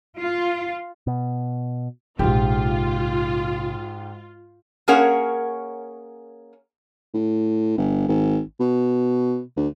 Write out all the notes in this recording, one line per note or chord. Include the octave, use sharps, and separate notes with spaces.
F4
B2
A#1 G#2 C3 F4 G4
A#3 C#4 G#4 A#4 C#5 F#5
A2
G1
G#1
B2
D2